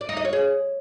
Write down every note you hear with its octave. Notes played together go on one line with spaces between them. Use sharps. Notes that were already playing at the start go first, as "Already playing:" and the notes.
D5
D#4
D#5
C#5
G#4